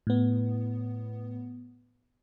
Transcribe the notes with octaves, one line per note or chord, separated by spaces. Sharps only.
A2 B3